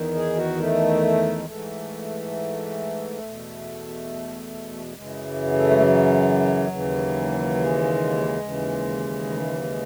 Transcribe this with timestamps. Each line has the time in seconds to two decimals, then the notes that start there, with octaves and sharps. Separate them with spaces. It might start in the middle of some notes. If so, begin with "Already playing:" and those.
Already playing: E2 D#3
0.15 G#4
0.36 F#4
0.58 A3
1.37 G#3
1.45 G#2 E3 A3
3.20 E2 B2
4.86 A3
4.94 F#2 C#3 E3 G#3
5.46 B3
5.52 A3
5.71 G#3
5.80 F#3
6.69 D#2 C#3 E3
7.55 G#3
8.42 D#2 C#3 E3
9.30 A3
9.41 G#3
9.51 F#3
9.63 G#3